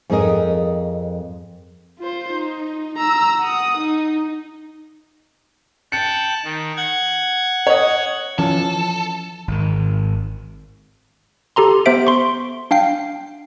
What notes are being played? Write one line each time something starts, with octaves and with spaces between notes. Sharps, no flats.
F2 C4 G#4 A#4 D#5
F4 C5
D#4
A#5 E6
F#5 D#6
D#4
G5 A5 F#6 C#7
D#3
F#5 G#6
C#5 D#5
E3 F3 C#4 A4
G#1 D#3
G4 A4 A#5 C6
B3 G4 C5 E5 D7
C6 C#6
D4 F5 G5 C7